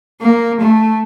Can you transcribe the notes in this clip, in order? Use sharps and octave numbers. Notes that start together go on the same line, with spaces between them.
A#3
A3